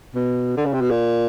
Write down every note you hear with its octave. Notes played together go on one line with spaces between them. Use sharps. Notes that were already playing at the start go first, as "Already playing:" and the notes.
B2
D3
C#3
C3
B2
A#2